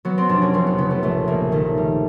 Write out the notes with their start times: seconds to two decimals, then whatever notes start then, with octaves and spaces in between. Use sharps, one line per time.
0.05 F#3 B3
0.18 C4
0.29 F1 D4
0.42 C#4
0.54 F1 C4
0.67 B3
0.78 C#3 B3
0.91 A3
1.03 A#1 A3
1.28 A#1 A#3
1.52 D#3 A3
1.78 G3